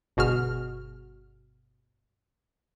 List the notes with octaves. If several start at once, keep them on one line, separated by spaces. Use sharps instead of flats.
G1 B2 F#4 G#4 F6